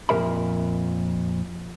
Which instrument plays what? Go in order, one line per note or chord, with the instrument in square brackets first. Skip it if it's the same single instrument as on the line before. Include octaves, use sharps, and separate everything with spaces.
[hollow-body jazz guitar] F2 A#2 E3 A#4 E5 B5